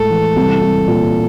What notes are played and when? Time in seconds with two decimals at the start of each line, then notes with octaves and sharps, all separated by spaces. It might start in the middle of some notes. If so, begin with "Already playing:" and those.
Already playing: A2 G#3 A4
0.10 E3
0.36 C2
0.62 C2
0.88 A#2